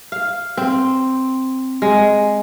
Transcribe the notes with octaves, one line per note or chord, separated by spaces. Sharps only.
F5
C4
G#3